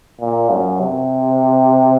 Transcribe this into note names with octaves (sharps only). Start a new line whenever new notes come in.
A#2
F#2
C3